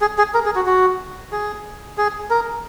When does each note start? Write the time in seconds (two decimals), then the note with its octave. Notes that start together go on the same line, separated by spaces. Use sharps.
0.01 G#4
0.18 G#4
0.34 A#4
0.45 G#4
0.56 F#4
0.66 F#4
1.32 G#4
1.98 G#4
2.31 A#4